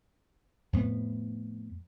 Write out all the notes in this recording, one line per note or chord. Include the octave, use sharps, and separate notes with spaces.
F2 A2 B3